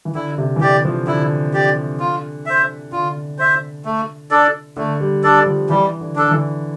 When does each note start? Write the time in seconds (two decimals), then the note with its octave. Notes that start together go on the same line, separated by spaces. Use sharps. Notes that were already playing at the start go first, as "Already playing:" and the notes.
0.05 E3
0.15 D3 E4
0.38 C3
0.56 E3
0.61 D3 G4 D5
0.85 F3
1.07 D3 E4
1.53 G4 D5
2.00 F4
2.46 C5 E5
2.92 D3 F4
3.39 C5 E5
3.85 A3
4.31 D4 A4 D5
4.77 D3 A3
5.00 G3
5.23 G3 D4 A4 D5
5.47 F3
5.69 E3 G3
6.01 D3
6.16 D4 A4
6.25 D3
6.31 E3